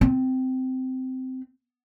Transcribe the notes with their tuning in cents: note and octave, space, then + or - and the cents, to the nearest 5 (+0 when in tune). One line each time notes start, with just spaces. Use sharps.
C4 -15